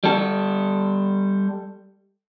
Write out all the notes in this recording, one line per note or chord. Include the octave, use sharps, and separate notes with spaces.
G3 A4